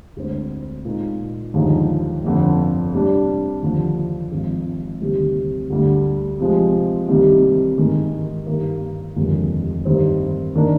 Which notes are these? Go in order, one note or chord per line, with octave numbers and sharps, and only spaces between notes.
D2 D3 G#3 C4
A#2 G#3 D#4
D#2 D3 F3 G#3 D#4
G1 F2 D3
C3 G3 D4
D#2 D3 F3
G#1 G#2 F3
D2 C3 D#3 G3
D2 D3 G3
C3 F3 G#3
C2 C3 D#3 G3
G#2 D#3 G#3
G2 D#3 A#3
F1 D#2 D3 F3 G#3
G2 D#3 G3 C4
D#3 A#3 D4